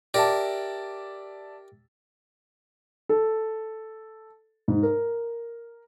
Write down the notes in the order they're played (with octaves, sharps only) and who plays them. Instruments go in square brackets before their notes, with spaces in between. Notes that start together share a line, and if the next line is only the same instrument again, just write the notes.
[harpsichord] G4 A#4 [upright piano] D5 E5 A5
[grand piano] A4
G#2
A#4